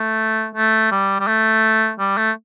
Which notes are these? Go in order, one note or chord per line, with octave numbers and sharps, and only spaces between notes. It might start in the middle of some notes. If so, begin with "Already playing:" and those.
Already playing: A3
A3
G3
G3
A3
G3
A3